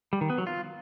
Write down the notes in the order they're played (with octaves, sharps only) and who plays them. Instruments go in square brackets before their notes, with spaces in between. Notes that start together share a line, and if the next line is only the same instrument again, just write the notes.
[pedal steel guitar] G3
D#3
B3
F#3
F4